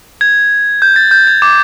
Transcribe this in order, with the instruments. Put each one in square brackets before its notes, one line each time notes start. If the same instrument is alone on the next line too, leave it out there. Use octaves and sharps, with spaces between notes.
[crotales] G#6
G6
A6
G6
G#6
D6